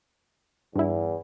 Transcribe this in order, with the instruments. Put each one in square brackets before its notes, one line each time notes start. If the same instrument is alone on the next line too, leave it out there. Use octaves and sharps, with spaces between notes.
[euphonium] E2 [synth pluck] G2 E4